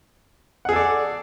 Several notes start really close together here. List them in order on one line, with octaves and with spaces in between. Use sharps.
F#5 G#4 A4 D5